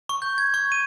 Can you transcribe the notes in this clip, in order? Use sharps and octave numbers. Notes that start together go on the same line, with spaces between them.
C#6
G6
G#6
C#6
D#7